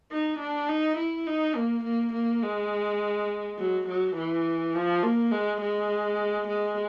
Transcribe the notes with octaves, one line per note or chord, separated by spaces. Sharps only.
D#4
D4
D#4
E4
D#4
A#3
A#3
A#3
G#3
F#3
F#3
E3
F3
A#3
G#3
G#3
G#3